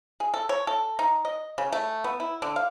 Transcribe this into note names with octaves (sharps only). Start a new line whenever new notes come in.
G#4
A4
C#5
A4
D#4
D#5
C#3
A3
B3
E4
D3
F5